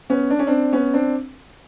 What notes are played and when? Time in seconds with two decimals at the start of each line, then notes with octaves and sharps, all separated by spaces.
0.10 B3 C#4
0.30 D4
0.39 C#4
0.47 C4 D4
0.73 B3 C#4
0.94 C4 D4